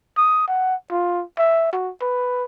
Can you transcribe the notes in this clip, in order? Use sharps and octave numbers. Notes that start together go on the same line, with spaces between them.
D#6
F#5
F4
E5
F#4
B4